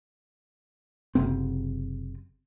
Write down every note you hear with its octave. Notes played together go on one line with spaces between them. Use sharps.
F#1 C3 C4